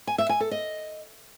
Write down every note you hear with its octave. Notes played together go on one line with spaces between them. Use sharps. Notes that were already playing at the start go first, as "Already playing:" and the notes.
G#5
E5
G#5
A4
D#5